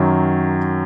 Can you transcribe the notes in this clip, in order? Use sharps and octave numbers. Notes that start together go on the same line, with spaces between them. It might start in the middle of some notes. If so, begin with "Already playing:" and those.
Already playing: F#2 D#3 F#3